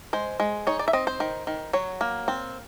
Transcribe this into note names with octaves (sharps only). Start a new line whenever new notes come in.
G#3 C5
G#3
D#4 C#5
D5
E5
C4 D#5
C5
D#3
D#3
F#3 C#5
A#3
C4